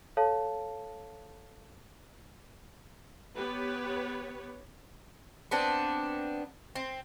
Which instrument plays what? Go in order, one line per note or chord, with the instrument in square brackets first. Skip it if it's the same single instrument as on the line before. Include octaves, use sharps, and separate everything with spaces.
[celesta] A4 C#5 F5 A5
[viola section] B3 G4 B4 C#5
[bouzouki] B3 C4 D4
C4